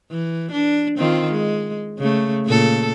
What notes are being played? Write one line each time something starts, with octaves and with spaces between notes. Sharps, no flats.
E3
D4
D#3 C4 F4
G#3
C#3 A3
A#2 C#3 A4